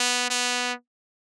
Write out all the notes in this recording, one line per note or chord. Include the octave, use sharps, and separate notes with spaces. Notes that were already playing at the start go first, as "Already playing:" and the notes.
Already playing: B3
B3